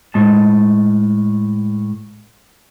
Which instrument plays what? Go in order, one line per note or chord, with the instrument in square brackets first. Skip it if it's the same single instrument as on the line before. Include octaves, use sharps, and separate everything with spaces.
[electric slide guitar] A2 G#3 A5